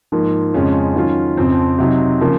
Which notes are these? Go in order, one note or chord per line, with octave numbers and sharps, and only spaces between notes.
G#2 F3 A#3
F2 C#3 G#3 C#4 F4
D#3 F#3 C#4 F4
F2 C#3 F3 C4
C3 F#3 C4 D#4
C#3 F3 A#3